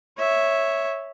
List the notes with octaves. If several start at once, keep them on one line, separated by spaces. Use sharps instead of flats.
C#5 E5